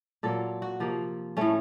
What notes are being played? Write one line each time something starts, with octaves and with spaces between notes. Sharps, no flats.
A#2 F#3 A#3 A4
F#4
C3 F3 A#3
A2 A3 C#4